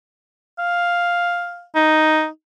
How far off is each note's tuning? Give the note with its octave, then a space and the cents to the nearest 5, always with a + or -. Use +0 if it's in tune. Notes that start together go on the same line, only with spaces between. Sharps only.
F5 +5
D#4 +0